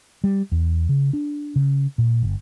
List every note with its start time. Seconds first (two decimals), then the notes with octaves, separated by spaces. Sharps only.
0.24 G3
0.52 E2
0.89 C#3
1.13 D4
1.56 C#3
1.98 A#2
2.23 G1